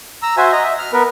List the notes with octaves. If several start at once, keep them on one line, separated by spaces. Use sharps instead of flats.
A#5 E6
F#4 C5 E5 G#5
D#5 A#5
E5
F6
B3 A#4 B4